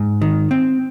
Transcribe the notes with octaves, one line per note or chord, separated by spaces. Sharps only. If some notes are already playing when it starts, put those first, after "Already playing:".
Already playing: G#2
D#3
C4